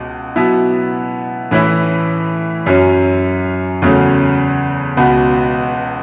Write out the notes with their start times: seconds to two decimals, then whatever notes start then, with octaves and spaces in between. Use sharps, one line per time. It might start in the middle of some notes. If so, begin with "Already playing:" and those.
Already playing: C#2 B2
0.36 B2 F#3 B3 E4
1.51 A2 E3 C#4 E4
2.66 F#2 F#3 C#4
3.82 E2 C#3 F#3 A3 C#4
4.97 C#2 B2 B3 F#4